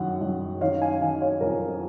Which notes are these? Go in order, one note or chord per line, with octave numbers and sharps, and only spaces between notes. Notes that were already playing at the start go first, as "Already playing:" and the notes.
Already playing: F#2 D#3 F#5
F#2
D#3 C#5 F5
F5 G#5
D#3 F5 G#5
C#5 F5
F2 A#4 C#5